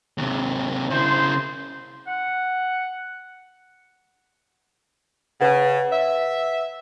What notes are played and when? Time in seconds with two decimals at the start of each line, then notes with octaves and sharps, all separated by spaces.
0.18 D#2 C3
0.90 C#3 E4 C5
2.07 F#5
5.41 C#3 B4 F#5
5.90 E5